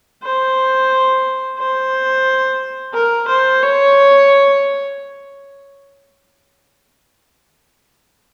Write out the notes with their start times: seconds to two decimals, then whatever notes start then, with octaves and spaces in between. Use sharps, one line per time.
0.23 C5
1.58 C5
2.94 A#4
3.28 C5
3.62 C#5